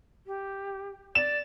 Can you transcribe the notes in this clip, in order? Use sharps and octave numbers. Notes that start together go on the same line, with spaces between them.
G4
D5 E7